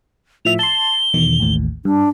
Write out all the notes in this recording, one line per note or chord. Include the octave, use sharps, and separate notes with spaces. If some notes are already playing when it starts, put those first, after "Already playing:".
A2 F3 E5 F7
A5 C6 G7
E2 B2 D#3
A1 D#2 A2
G2 D4